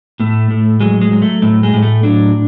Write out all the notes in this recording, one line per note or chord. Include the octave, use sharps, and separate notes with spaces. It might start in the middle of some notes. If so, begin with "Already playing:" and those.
A2 A3
A2
F#3 G#3
G#3
F#3
A3
A2 A3
G#3
A2
A3
F#3 D4